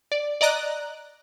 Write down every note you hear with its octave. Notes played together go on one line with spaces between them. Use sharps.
D5
D5 D#5 A#5 F#6